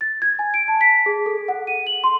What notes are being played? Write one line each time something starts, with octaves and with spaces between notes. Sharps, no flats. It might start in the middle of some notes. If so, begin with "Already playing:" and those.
A6
G#6
G#5
D7
A5
B6
G#4
A4
F#5
D#7
F#7
C6